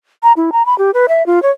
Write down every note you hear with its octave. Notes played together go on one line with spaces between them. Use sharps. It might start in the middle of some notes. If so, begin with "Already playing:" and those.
A#5
E4
A#5
B5
G4
B4
E5
F4
C#5